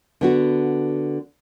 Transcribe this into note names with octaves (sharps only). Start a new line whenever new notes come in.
D3 B3 F#4